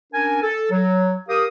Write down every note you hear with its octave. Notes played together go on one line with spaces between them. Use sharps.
C#4 D4 A#4 G#5
A4
F#3
G4 A#4 F5 D#6